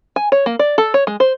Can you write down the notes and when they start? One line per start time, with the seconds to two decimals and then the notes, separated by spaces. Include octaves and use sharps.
0.16 G#5
0.32 C#5
0.46 A#3
0.59 D5
0.78 A4
0.94 C#5
1.07 G#3
1.20 C5